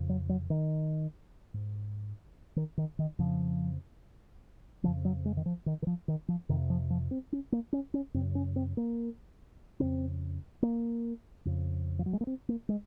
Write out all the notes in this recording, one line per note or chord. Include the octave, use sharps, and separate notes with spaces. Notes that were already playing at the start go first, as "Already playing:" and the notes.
Already playing: F2 C#3
F#3
F#3
D#3
G#2
D#3
D#3
D#3
F2 C#3 F3
F2 C#3 F3
F#3
G#3
D#3
F3
D#3
D#3
F3
D#3
F3
F2 C3 D#3
F3
F3
C4
C#4
A#3
C#4
C#4
F#2 C#3 C4
C#4
C4
A#3
F2 C#3 C4
A#3
F2 C#3
F3
F#3
G#3
A#3
C4
A#3
G#3